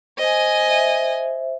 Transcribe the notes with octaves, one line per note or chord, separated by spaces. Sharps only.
C5 D#5 G#5
C5 E5